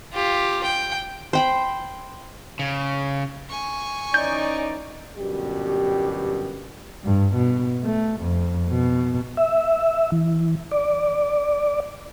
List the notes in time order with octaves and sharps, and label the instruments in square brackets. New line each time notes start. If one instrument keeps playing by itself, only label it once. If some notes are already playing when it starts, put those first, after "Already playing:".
[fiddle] F4 G4
G5
[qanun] C5 G5 B5
[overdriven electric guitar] C#3
[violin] G#5 C#6
[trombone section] E3 C#4 D#4 [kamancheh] D5 [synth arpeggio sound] G6
[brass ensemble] G1 F#2 B2 G3 G4
[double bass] G2
B2
A3
F2
B2
[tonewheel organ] E5
E3
D5